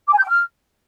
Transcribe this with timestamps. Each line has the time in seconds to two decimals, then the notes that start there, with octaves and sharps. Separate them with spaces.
0.08 D6
0.13 G#5
0.18 G6
0.23 G5
0.28 F6